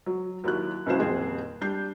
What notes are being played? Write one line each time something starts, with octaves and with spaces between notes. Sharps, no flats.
F#3
D#2 F#3 E4 F#6
C#2 C#3 F#3 E4 C5 E7
D#1 F2 C4 G#4 C5
G3 D4 G6 C7